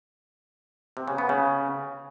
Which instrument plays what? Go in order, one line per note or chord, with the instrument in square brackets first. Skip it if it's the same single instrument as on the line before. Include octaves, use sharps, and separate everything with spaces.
[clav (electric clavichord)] C3
C#3
B3
C#3